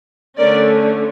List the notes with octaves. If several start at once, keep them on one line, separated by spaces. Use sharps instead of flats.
D3 A3 C#4 A#4 D5